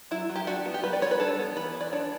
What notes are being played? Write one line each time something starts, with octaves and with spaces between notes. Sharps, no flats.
F#3 E4
F#3
G4
D4 F#4
B3
G4
G3 B4
D5
G3 C#5
B4
D4 A4
B3
E3 B4
E3
D5
D4 C#5